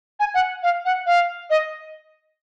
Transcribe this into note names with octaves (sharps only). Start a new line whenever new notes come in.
G#5
F#5
F5
F#5
F5
D#5